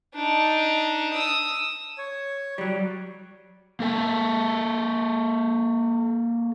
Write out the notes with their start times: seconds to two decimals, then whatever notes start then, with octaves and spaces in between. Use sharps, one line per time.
0.15 D4 D#4
1.14 D#6 E6
1.98 C#5
2.58 F#3 G3
3.80 A#3 A4 G#5 A5